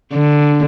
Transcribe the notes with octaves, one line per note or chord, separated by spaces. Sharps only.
D3